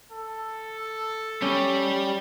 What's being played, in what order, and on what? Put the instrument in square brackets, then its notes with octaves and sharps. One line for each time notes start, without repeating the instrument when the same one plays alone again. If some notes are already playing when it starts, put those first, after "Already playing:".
[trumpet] A4
[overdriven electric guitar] G3 G4 [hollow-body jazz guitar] C#4